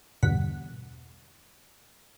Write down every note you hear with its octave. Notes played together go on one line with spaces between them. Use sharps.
E2 G2 B2 D3 F#5 B6